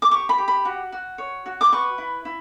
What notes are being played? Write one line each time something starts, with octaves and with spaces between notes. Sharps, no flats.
D6
G4 C#6
B5
G4
B5
F#4
F#4
C#5
F#4
D6
B4 C#6
E4
E4